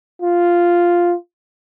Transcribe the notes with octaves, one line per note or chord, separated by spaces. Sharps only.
F4